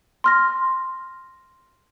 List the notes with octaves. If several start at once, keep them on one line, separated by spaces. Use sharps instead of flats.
C6 F6 A#6